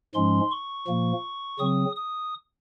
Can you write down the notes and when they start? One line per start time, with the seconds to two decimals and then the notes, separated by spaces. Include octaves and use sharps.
0.14 G#2 F3 G#3 C#4 C6
0.51 C#6
0.87 A#2 F3 A#3
1.59 C#3 F#3 C4 D#6
1.96 D#6